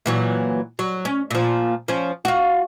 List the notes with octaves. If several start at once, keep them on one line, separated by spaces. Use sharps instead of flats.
A#2 E3 F#3
F#3
C#4
A#2 F3
F3 C#4
F4 F#4